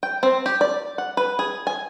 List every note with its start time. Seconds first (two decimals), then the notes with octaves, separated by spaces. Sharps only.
0.03 G5
0.23 C4
0.46 G4
0.61 D5
0.98 F#5
1.17 B4
1.39 G#4
1.67 G#5